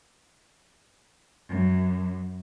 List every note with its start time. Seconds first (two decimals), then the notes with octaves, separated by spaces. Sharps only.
1.49 F#2